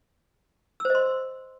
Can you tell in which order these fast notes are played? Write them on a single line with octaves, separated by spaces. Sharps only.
E6 C5 D#5 C6